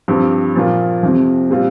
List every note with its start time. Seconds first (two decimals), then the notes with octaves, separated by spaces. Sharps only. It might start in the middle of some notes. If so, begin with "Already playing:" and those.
0.08 G2 F3 C4 G4
0.55 A#2 F3 A#3 F4
1.03 F2 C3 F3
1.50 A#2 G3 C4 F4